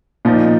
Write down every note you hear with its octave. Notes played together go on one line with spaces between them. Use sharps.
A#2 F3 A#3 D#4